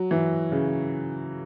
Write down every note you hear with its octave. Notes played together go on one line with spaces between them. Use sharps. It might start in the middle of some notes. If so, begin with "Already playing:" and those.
Already playing: F#3
E3
C#3